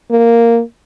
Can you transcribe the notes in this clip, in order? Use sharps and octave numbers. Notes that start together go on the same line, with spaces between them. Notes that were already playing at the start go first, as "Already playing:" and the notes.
A#3